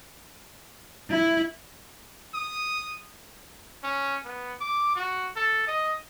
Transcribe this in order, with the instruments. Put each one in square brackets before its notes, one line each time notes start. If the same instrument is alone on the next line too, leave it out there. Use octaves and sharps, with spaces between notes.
[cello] E4
[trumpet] D#6
C#4
B3
D6
F#4
A4
D#5